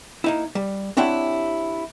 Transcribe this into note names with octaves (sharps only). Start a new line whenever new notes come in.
A#3 D#4 E4
G3
C4 D4 E4 G4 C#5 F#5